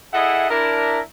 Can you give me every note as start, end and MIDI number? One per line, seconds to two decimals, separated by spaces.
0.13 0.50 64
0.13 0.50 68
0.13 0.50 69
0.13 0.50 75
0.13 0.50 76
0.13 0.50 78
0.50 1.00 62
0.50 1.00 64
0.50 1.00 70